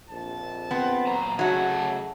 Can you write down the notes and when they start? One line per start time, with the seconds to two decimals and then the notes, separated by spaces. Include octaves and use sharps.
0.10 A#1 F2 A5
0.71 B3 C4
1.07 A#2 F#3 A#5
1.39 C#3 F#3 A3 F#4 D#5 E5 A5